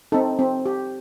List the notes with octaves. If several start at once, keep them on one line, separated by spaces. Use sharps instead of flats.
C4 D#4 A4
C4
G4